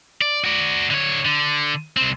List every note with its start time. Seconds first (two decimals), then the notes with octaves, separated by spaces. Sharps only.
0.22 D5
0.44 F#4 D5
0.90 D3 C#5
1.25 D3
1.97 C2 C4